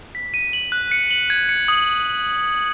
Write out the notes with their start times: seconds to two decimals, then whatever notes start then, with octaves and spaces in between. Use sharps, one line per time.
0.15 B6
0.34 D#7
0.53 F#7
0.72 F#6
0.91 C#7
1.11 F#7
1.30 G#6
1.49 C#7
1.68 D#6